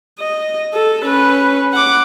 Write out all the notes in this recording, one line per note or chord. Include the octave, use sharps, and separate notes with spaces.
D#5
A4
C#4 B4
F#5 D6